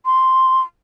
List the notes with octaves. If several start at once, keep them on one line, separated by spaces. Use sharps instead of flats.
C6